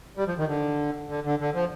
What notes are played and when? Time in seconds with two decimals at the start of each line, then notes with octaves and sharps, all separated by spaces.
0.17 G3
0.27 F3
0.38 D#3
0.48 D3
1.09 D3
1.25 D3
1.40 D3
1.54 F3